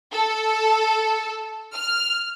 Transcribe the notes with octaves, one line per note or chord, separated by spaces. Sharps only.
A4
F6